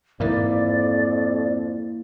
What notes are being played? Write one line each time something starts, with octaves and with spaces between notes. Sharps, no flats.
F2 G#2 E3 A#3 E4 A#4 D5